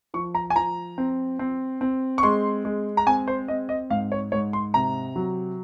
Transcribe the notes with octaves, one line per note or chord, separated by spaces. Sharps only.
F3 C#6
A#5
G#5
F3 A#5
C4
C4
C4
C#6
G#3 C6
G#3
A#5
C4 G#5
C5
C4 D#5
D#5
G#2 F5
C#5
G#2 C#5
C6
C3 A#5
F#3